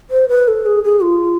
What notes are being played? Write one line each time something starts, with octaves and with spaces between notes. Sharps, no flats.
C5
B4
A4
G#4
G#4
F4